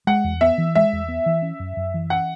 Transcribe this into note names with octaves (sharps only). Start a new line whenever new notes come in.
G#3 F#5
E2
B3 E5
E3
G#3 E5
E2
B3
E3
C#4
F#2
F#2
E3
C#4 F#5